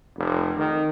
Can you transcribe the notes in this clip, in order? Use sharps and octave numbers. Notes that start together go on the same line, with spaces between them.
F1
D#3